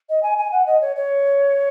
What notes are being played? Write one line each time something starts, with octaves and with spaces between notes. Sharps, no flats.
D#5
G#5
G#5
F#5
D#5
C#5
C#5